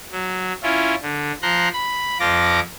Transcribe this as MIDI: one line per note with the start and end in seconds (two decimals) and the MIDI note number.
0.12 0.53 54
0.63 0.95 61
0.63 0.95 64
0.63 0.95 65
1.02 1.32 50
1.42 1.69 53
1.42 1.69 82
1.42 1.69 84
1.42 1.69 90
1.73 2.18 83
2.20 2.60 41
2.20 2.60 53
2.20 2.60 65
2.20 2.60 86
2.20 2.60 94